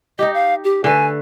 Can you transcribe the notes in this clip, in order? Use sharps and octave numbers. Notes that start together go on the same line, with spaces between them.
D#4 G4 D#5
F5
G4
D3 A3 B4 G#5